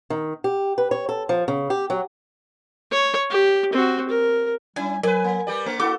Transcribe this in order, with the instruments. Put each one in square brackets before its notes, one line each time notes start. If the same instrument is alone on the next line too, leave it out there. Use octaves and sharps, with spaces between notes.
[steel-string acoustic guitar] D#3
G4
B4
C#5
A4
F3
C#3
G4
F#3
[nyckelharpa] C#5
G4
C4 F#4
A#4
[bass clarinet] G3 [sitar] C#4 E4 [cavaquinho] G#5
[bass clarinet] F#3 [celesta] A#4 [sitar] B4 D5 [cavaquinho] G#5
[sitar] A#3
[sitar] G3 G4 D5 [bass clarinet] B4
[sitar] A3
[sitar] A#3 F#4 A4 [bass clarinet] E4 [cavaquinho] D6